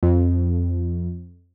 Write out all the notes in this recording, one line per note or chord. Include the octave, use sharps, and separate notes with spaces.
F2